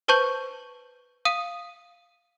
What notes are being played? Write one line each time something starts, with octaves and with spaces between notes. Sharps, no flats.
B4 C5 A5 C#6 G6 F#7
F5 D#6 D#7